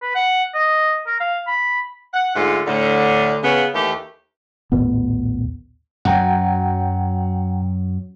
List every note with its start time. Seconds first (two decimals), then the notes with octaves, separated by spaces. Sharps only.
0.02 B4
0.15 F#5
0.54 D#5
1.06 A#4
1.20 F5
1.47 B5
2.13 F#5
2.35 G#2 D3 A3 F4
2.67 D2 A2 D3
3.43 C#3 B3
3.73 D#2 E3 A3 G4
4.72 A#1 D#2 A2 B3
6.05 F#2 F#3 F#5 G5 A#5